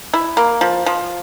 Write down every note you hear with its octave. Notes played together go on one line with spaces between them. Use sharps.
E4
A#3
F3
F3